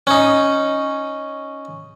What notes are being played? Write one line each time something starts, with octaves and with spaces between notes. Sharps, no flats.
C#4 D#4